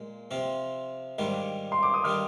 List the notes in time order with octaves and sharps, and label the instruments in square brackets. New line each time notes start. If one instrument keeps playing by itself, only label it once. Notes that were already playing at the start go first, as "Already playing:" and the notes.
Already playing: [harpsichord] A#2 G#3
C3 F3 C4 F4
G#2 D#3 G3 D4 F4
[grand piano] C6
D6
D#6
[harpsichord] D#3 G3 D4 F4 [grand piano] F6